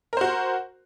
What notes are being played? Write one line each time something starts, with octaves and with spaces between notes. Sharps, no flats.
F#4 A#4 C5